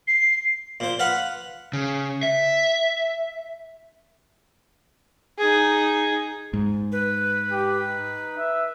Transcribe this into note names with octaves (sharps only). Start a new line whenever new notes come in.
C7
A#2 C5
B4 F5 F#5
C#3
E5
D#4 G#4
G#2
B4
G4
D#4
E5